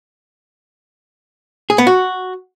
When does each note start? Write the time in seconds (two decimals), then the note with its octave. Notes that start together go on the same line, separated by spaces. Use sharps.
1.70 G#4
1.78 B3
1.87 F#4